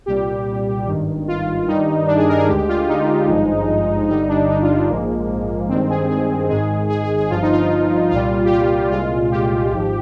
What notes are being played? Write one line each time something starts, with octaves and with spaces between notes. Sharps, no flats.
C2 A#2 G3 G4
G#1 G2 D#3
F4
G2 D#3 G3 D#4
D4
G#4
A#4
G#4
D2 D3 G#3 G4
F4
D#4
G#1 G2 F3 G#3
G1 G2 D3 G3 D#4
D4
D#4
F4
D4
A#1 G#2 F3 G#3 A#3
G2 D#3 G#3 C4
G#4
G#4
G#1 G#2 D#3 G#3 G#4
G#4
G#4
G#4
G1 G2 F3 F4
D#4
F4
C2 A#2 G3 F4
G4
F4
C2 A#2 G#3 F4
G4
G#1 G#2 F3